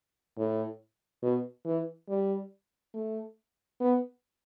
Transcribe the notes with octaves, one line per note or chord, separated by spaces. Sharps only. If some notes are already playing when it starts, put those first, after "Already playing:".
A2
B2
E3
G3
A3
B3